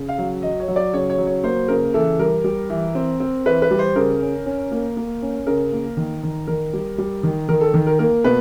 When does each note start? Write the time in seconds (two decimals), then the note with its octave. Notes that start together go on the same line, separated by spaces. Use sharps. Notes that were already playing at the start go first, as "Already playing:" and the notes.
Already playing: C#3
0.09 F5
0.18 F#3
0.42 F#3 D#5
0.60 C#5
0.68 F#3
0.76 D5
0.94 C#3 C#5
1.10 C#5
1.18 F#3
1.27 C#5
1.43 A#3 C5
1.68 C#3 A#4
1.94 E3 A4
2.19 G3 A#4
2.44 G3
2.70 E3
2.95 C4
3.20 C4
3.46 E3 B4
3.62 B4
3.71 G3
3.79 C5
3.96 C#3 A#4
4.21 C#4
4.46 C#4
4.72 A#3
4.97 A#3
5.22 C#4
5.47 C#3 A#4
5.72 A#3
5.97 D#3
6.23 D#3
6.47 D#3 A#4
6.73 G3
6.98 G3
7.23 D#3
7.49 D#3 A#4
7.61 A4
7.74 D#3
7.87 A#4
7.99 A#3 A#4
8.24 B2 B4